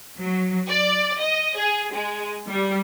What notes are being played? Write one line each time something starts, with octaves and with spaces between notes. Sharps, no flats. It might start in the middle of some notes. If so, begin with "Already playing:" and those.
F#3
D5
D#5
G#4
G#3
G3